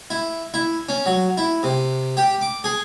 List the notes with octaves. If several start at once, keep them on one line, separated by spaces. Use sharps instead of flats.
E4
E4
C#4
F#3
E4
C3
G4
D6
G#4